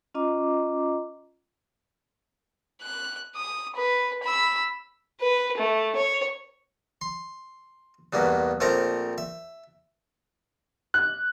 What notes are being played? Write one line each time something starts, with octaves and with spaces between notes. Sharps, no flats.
C#4 F4 D#5 A#5 D6
F#6
D#6
B4
B5 E6
B4
A3
C#5
C6
E2 G2 B2 A#3
A#1 A3 C4 A#4 A#5
E5
F#6